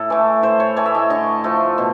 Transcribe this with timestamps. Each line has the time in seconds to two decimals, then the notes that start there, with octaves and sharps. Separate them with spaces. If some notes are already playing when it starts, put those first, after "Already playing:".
Already playing: A2 A4
0.10 E3 A3
0.43 A2 C5
0.60 C#5
0.76 E3 A3 C#5
0.86 E5
0.94 D#5
1.10 D3 D#5
1.44 F3 A3
1.78 B2